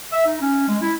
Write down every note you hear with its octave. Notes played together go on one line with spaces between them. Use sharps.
E5
D#4
C#4
G#3
E4